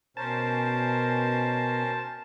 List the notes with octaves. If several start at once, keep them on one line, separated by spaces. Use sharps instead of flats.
B2 C#4 A#4 C5 A5